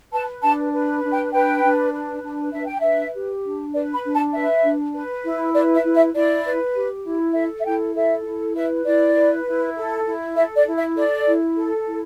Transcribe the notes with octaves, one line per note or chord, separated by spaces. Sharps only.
B4 A5
D4 A5
B4
D4
G5
B4 G5
D4
B4
D4
D4 E5
G5
B4 E5
G4
D4
B4 D5
B5
D4
A5
B4 E5
D4
B4
E4
B4 D5
E5
E4
E5
E4 D5
B4
G4
E4
A4 E5
E5
E4 G5
A4 E5
E4
B4 E5
E4 D5
B4
E4
A4
E4
A4 E5
D5
E4
E5
A4 D5
E4
A4
E4